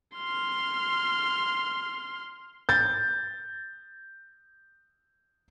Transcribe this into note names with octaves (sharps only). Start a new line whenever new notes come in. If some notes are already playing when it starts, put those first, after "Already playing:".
C6 F6
G6 A6